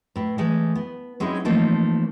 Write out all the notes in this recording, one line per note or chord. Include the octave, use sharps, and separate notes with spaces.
A2 B4
E3 G#3 A3
B3
F#3 G#3 C4 C#4 D#4 E4
E3 F3 A3 A#3 C4 D#4